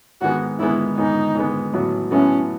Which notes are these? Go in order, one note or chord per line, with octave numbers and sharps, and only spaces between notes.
G#2 D#3 G#3 B3 F#4
G#2 D#3 G#3 B3 E4
G#2 D#3 G#3 B3 D#4
G#2 D#3 G#3 B3
A1 A2 F#3 B3 F#4
A1 A2 F#3 B3 C#4 F#4